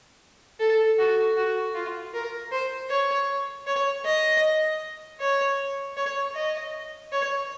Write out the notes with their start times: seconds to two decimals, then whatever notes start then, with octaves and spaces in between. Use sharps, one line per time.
0.59 A4
0.98 F#4
1.37 F#4
1.75 F4
2.14 A#4
2.52 C5
2.90 C#5
3.67 C#5
4.05 D#5
5.20 C#5
5.97 C#5
6.35 D#5
7.12 C#5